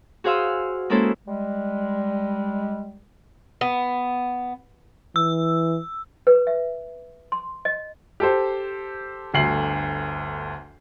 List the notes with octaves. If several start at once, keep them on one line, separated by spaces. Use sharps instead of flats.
F#4 G#4 C5 F5 C6 E6
G#3 A#3 C#4 E4 A4 C5
G3 G#3
B3
E3 E6
B4
E5
C6
D#5
G4 A4 C5
G1 D2 C7 F#7